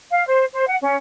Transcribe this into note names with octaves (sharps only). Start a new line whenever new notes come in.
F5
C5
C5
F#5
C#4